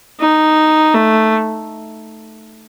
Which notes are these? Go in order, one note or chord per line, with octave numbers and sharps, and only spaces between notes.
D#4
A3